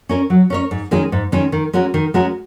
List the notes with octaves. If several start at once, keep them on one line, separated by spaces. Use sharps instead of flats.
C#4 A#4 C#5
F#3
C#4 A#4 C#5
G#2
D#3 G#3 C#4 G#4
G#2
D#3 G#3 C#4 G#4
D#3
G#3 C#4 F#4 A#4
D#3
G#3 C#4 F#4 A#4